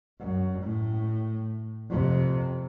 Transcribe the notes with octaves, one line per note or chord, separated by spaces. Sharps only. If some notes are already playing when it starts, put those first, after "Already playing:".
F#2
A2
F2 C3